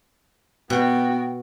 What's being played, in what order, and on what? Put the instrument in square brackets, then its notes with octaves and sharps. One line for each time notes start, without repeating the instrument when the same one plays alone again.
[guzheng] B2 [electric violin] B3 F#4 [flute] G5